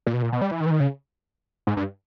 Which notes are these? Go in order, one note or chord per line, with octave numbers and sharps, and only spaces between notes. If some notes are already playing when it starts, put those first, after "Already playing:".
A#2
B2
A#2
B2
G3
E3
D#3
E3
D#3
C#3
G#2
G2